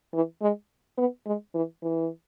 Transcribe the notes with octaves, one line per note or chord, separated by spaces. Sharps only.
E3
G#3
B3
G#3
E3
E3